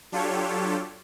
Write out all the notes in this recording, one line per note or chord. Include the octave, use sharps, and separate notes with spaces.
F#3 D4 F4 G4 A4 C#5